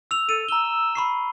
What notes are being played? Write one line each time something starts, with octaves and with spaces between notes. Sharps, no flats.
E6 F7
A4 D#7
A#5 E6 G7
B5 C#6 C7